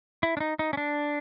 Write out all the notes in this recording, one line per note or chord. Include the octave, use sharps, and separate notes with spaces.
E4
D4
D#4
D#4
C#4
D4